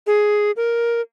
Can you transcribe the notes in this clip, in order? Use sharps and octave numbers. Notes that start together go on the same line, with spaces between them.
G#4
A#4